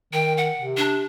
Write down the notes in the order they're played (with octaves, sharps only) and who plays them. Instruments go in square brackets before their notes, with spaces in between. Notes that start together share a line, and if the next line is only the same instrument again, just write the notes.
[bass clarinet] D#3 [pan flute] G5
[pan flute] F#5
[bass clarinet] C3
[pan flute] D4